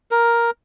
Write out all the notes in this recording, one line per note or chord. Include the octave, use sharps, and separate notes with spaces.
A#4